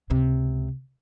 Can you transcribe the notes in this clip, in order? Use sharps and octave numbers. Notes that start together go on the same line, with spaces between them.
C#2 C3